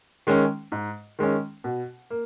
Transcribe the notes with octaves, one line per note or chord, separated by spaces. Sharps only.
D#3 G#3 C#4
G#2
D#3 G#3 C#4
B2
A#3